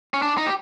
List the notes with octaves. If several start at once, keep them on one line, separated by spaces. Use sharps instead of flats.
C#4
D4
D#4
G4